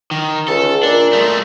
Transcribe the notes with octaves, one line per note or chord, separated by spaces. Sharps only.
D#3
C#2 A4
A#2 D4
G#3 A3